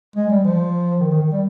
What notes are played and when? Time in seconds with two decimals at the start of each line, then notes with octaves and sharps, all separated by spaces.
0.16 G#3
0.30 G3
0.45 F3
1.00 D#3
1.11 D#3
1.22 D#3
1.32 G3